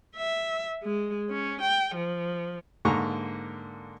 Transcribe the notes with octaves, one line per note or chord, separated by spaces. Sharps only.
E5
G#3
C#4
G5
F3
G#2 D3 A#3 A#5 C#6